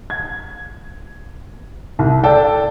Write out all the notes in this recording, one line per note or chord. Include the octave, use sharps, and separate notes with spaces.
G#6
C2
A4 D5 G5 A5